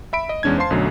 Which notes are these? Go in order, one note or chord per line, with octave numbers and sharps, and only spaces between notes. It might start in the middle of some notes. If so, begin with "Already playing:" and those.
E5 B5 D7
D#5
E2 G#3 C#4 D4 G#6
C5 F5 A5 C6 C7
B1 F#2 D3 F#3 A3